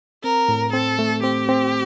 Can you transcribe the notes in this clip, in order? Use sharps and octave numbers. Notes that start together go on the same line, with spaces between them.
C4 A#4
A2
C4 A4
A3
C4 G4
C4